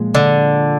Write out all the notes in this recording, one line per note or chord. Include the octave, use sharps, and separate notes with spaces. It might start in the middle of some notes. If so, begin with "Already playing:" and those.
Already playing: A#2 F3 G#3
D3